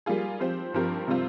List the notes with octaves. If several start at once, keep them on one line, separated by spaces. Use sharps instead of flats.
G3 A#3 F4 G#4
F3 C4 G4 C5
G2 F3 C4 G4 A#4
C3 G3 C4 F4